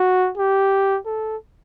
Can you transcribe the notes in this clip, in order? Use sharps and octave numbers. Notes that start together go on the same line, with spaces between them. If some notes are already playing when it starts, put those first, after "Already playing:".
Already playing: F#4
G4
A4